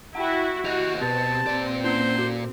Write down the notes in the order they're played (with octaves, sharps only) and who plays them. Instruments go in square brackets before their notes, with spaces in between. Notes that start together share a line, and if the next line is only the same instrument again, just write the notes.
[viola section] E4 F#4 [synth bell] F#5 G5
[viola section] F#4 [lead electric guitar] G4 D#5 [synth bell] F#6 A#6 F7
[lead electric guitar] B2 [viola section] C4 [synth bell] G4 B4 [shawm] A5
[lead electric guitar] A#2 D5
[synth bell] A#3 C#4 [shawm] C5
[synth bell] F#4